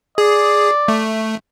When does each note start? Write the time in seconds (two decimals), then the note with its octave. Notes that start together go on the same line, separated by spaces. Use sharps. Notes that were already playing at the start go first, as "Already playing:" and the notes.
0.18 G#4 D5
0.88 A3